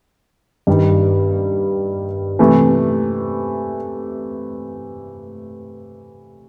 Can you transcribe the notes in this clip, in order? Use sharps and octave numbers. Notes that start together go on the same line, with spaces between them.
G2 D#3 G3
C3 E3 A3